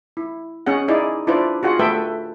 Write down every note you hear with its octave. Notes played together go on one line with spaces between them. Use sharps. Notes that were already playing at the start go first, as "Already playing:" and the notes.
E4
C#4 G#4 F#5
D#4 E4 G#4 D5
D4 E4 F4 B4 C5 D5
F4 F#4 G#4 F#5
A3 A4 B4 E5 G5